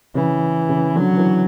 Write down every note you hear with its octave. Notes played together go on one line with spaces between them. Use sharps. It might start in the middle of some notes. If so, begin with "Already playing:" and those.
C#3 E3
C#3
D3 F#3
E3